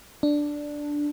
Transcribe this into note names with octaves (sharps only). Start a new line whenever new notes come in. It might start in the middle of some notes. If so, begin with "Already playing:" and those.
D4